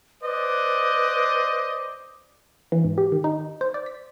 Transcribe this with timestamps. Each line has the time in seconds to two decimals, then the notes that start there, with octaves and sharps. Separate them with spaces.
0.22 B4 C5 D5 D#5
2.72 E3
2.84 G#2
2.98 G4
3.12 D#3
3.24 D#4
3.61 C5
3.74 D5
3.86 B6